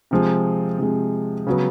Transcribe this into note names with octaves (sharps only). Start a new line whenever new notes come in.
C3 F3 G#3
C3 F3 G#3
C#3 F#3 B3